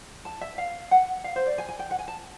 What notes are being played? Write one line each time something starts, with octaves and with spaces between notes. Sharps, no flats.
A5
E5
F5
F#5
F5
C5
D5
G#5
G#5
G5
F#5
G#5
A5